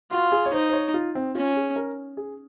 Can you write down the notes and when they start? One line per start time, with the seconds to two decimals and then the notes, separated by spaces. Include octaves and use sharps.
0.11 F4 F#4
0.32 G#4
0.46 C#5
0.53 D#4 C5
0.70 C5
0.73 C#5
0.94 F4
1.15 C4
1.35 C#4 F4
1.56 G#4
1.76 A#4
2.17 G#4